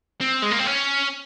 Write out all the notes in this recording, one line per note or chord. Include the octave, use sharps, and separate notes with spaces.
C4
G#3
A#3
C4
C#4